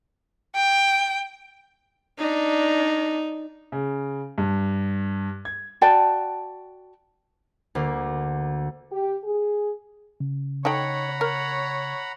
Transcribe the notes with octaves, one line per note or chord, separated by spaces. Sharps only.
G5
D4 D#4
C#3
G2
G#6
F#4 D5 G5 A5
D2 A#3
G4
G#4
C#3
D#4 A4 C#5 F#5 G5 A#5 B5
A#4 C#5